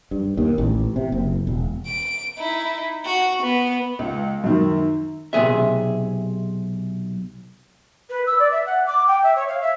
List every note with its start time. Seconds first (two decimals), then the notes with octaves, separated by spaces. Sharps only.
0.11 G2
0.37 D#2
0.58 A1
0.96 C3
1.12 F#1
1.47 E1
1.86 D7
2.38 D#4 E4
3.05 F#4
3.43 B3
3.99 C#2
4.44 F#2 D#3
5.33 B1 C3 F3 G#4 E5
8.10 B4
8.27 E6
8.39 D5
8.51 E5
8.66 F#5
8.87 D6
9.07 G5
9.23 E5
9.36 C#5
9.48 F5
9.61 E5